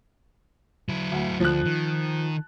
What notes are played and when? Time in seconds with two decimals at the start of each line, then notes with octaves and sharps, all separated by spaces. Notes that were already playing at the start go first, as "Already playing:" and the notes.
0.89 F#3 E4
1.12 D2
1.40 D2 F3 F#6
1.65 D#3